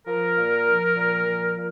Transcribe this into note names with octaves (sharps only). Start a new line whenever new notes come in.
F3 A#4
A#2
F3
A#2
F3
A#2